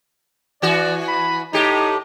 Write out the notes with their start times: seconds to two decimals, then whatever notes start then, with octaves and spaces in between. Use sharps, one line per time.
0.62 E3 F#4 D5
1.08 B5
1.53 A2 D#4 G4